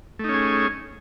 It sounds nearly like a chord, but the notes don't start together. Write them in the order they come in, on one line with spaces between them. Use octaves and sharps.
A3 D#4 C#4 G#4